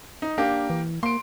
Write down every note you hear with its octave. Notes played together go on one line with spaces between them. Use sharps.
D#4
A#3 D4 G4
E3
A#3 C6 D7